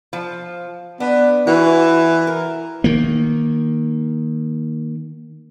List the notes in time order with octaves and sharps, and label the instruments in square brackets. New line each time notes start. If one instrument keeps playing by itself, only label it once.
[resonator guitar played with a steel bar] F3
[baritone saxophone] B3 [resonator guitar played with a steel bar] D4
[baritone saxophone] E3 [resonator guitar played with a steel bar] F#4
[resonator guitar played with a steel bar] A#4
[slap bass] D#3 A#3